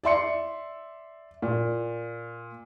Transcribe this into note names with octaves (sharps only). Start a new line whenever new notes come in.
D5 E5 C6 C#7
A#2